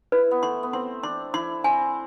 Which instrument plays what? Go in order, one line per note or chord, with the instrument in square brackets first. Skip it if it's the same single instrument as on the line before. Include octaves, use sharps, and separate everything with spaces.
[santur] E4 [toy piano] B4
[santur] B3
[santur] A3 [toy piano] C6
[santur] B3
[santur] C4 [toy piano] C6
[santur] D4 [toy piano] C6
[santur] E4 [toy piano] C6
[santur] C4 [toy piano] G#5